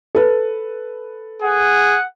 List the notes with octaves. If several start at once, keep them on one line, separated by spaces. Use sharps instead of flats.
A4 B4
G#4 F#5